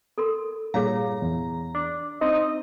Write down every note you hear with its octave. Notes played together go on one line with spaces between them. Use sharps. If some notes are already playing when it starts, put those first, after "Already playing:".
A4 A#4 C6
G2 A#2 G#4 C#5 F5 A#5
E2
D4
C4 D#4 D#5